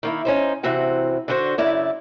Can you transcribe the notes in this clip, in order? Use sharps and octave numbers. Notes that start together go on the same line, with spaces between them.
D#3 A#3 E4
C#4 D#4 C5
C3 E3 C4 F#4 F#5
D3 D4 E4 F#4 C5
F#2 C#3 E4 D5